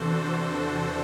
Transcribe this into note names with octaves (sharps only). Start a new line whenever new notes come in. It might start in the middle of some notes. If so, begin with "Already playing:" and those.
Already playing: E2 C3 E3 D4 F#4 A4 C5
D4